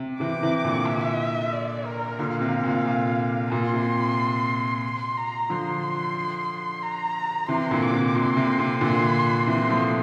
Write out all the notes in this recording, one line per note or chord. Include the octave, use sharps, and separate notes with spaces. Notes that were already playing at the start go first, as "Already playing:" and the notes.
Already playing: C3
C3 E3 D6
C3 E3
A#2 D3
E5
D5
A#4
A#2 D3 F5
C3
A#2
A#2
A#2 C6
C3
C6
A#5
D3 F3 C6
A#5
C3 E3 C6
A#2 D3
D6
C3
A#2 C6
C3
C3
A#2 D3 C6
C3 E3 C6
F3 A3